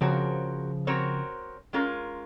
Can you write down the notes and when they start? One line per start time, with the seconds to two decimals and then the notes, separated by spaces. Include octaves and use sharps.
0.01 C#3 F3 C4 F#4 A#4 C#5
0.87 C4 F#4 A#4 C#5
1.73 G#3 C#4 F4 A#4